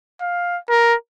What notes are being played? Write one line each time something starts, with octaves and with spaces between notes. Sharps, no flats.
F5
A#4